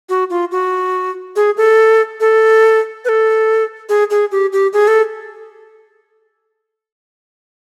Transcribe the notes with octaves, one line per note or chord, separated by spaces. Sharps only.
F#4
F4
F#4
G#4
A4
A4
B4
A4
G#4
G#4
G4
G4
G#4
A4